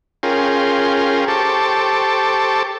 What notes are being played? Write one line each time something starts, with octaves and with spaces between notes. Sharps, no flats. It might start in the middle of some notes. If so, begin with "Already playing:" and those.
C#4 F4 G#4 A#4 G5 C6
G4 A4 C5 A5 C#6 D6